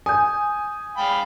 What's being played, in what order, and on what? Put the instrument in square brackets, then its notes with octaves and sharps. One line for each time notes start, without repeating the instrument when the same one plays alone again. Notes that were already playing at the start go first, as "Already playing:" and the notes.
[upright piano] G#5 [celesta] D#6 G6
[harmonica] F5 G5 B5